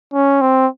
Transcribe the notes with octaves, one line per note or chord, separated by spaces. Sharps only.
C#4
C4